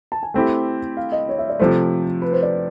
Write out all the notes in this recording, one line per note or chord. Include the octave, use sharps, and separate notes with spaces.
A5
G#5
A3 C4 E4 G4 G5
F5
D#5
C#5
E5
D5
C3 F3 A3 C5
B4
C5
D5